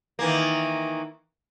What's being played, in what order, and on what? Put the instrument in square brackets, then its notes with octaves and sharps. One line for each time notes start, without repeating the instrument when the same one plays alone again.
[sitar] D#3 E3 A#3